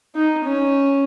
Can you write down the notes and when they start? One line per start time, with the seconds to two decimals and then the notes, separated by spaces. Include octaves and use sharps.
0.16 D#4
0.44 C#4